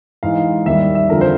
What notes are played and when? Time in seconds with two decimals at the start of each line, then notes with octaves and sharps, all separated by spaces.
0.23 G#2 E3 G#3 F5
0.66 D#2 D#3 G3 E5
0.95 E5
1.09 F2 D3 F3 A#4
1.21 C5